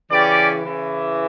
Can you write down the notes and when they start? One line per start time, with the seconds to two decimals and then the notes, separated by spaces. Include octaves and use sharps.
0.11 C#3 E3 C#4 G4 D5
0.65 C#3 E3